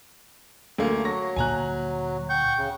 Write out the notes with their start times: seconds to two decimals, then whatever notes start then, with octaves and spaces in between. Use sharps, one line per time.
0.78 D2 A3 A#3
1.04 F#3 C#6 A#6
1.36 D2 A#2 A#3 G#5 A#5 F#6
2.29 F#5 G5 C#6 G6
2.58 C#3